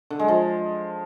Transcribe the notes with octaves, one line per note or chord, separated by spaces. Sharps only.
D3
G#3
F3